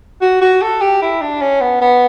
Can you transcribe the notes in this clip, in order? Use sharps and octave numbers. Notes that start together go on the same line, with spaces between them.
F#4
F#4
A4
G4
E4
D4
C#4
B3
B3